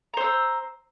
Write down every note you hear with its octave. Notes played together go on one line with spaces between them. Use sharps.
C5 A#5 E6